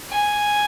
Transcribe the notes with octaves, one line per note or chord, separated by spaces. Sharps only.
G#5